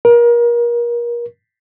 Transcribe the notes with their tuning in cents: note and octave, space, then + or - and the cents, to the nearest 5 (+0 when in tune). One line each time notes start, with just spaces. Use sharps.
A#4 +30